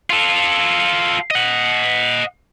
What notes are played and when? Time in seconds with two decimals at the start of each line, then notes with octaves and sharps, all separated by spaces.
0.10 F4 A4
1.31 D#5 F#5